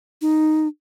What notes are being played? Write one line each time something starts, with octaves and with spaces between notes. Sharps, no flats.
D#4